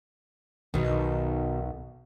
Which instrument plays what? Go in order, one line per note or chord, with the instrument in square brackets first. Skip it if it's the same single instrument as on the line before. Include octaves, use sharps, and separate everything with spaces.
[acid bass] B1 [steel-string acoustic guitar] B2 D#3